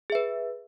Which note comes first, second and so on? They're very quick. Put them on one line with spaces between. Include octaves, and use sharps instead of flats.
G#4 E5 B4